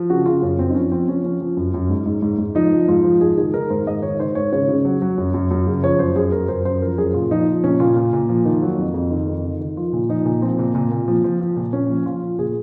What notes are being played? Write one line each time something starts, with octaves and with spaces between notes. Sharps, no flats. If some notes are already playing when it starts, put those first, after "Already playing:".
Already playing: F3
C#3 F#4
C#3 F4
F#2 C#4
F#2 C4
D#4
F3 C#4
F3 C4
F3 C#4
F3 C#4
F3
F#2
F#2
G#2
G#2
G#2
G#2
F3 D#4
F3
G#2 F4
F3
G#2 G#4
D#3 G#4
D#3 A#4
G#2 C5
G#2 D#5
D#3 C#5
D#3 C5
G#2 C#5
C#3 C#5
C#3
F#3
F#3
F#2
F#2
F#2
C#3
F3 C#5
F#2 C5
F#2 G#4
F#2 A#4
F#2 C5
F#2 C5
F3 A#4
F#2 G#4
A#2 F4
F3 D#4
F3
A#2 C#4
A#2 F4
A#2
A#2
F3
D#3
F#3
F2
F2
D#3
F2
D#3
D#3
F3 F4
A#2
F3 D#4
A#2
F3 C4
A#2
A#2
A#2
F3
F3
F3
A#2
A#2 C#4
F3
F3 F4
F3
A#2 G#4